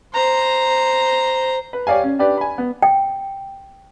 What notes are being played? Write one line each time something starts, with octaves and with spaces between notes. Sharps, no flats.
C5 A#5
B4
G4 C#5 D5 F5 G#5
C#4
D4 G4 B4 D5
G#5 B5
B3
G5